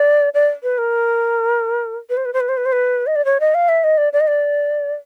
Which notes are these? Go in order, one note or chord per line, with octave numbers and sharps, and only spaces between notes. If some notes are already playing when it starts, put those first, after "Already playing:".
Already playing: D5
D5
B4
A#4
B4
C5
B4
C5
B4
C5
B4
C5
B4
D#5
D5
C#5
D#5
F5
E5
D#5
D5
D5
D#5
D5